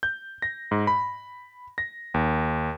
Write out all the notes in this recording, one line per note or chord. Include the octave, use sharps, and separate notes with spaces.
G6
A#6
G#2
B5
A#6
D#2